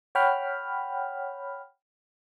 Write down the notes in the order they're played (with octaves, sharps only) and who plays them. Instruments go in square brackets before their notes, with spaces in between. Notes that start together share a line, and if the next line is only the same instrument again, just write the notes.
[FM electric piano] C#5 F#5 G5 B5 F6